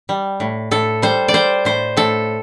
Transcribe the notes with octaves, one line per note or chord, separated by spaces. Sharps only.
G3
A2
A2 A4
G3 C5
D5
G3 C5
A2 C5
A2 A4